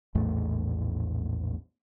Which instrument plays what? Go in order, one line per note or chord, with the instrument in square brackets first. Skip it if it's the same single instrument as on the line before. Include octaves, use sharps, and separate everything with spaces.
[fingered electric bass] A#1 E2 A2 A3